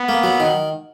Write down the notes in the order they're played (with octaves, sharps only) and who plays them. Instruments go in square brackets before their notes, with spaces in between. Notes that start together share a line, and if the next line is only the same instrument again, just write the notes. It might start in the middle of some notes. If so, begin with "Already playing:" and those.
Already playing: [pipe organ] B3
[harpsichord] A#3
F#3
D#3